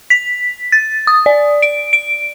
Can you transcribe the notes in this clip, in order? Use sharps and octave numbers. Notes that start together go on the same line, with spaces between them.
B6
A6
D#6
D5
D7
D7